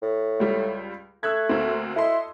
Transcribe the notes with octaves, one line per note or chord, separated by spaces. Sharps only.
A2
C#2 G3
A3 E6 F#6 G#6
D2 A#3 C4
E4 A4 D#5 C6